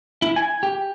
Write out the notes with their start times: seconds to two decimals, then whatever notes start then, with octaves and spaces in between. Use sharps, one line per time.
0.22 E4
0.36 G#5
0.63 G4